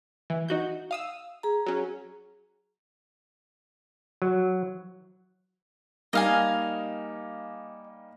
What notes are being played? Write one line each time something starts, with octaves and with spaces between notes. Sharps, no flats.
E3
D#4 F#4 G6
F5 D#6 E6
G#4 A#5
F#3 C#4
F#3
G3 A#3 D#4 D#5 F5 G#5